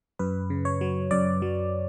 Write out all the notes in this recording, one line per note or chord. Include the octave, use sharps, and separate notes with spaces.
F#2 B4
C#3
C#5
F#3
F#2 D5
F#3